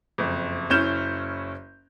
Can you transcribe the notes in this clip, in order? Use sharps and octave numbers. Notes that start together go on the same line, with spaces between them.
F#1 F2
F#1 C#4 E4 F6 G6 E7